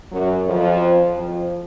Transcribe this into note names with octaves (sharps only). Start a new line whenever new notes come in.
F#2 F#3
F2 F3
F2 F3